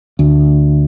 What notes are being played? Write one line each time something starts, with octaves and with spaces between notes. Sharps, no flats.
D2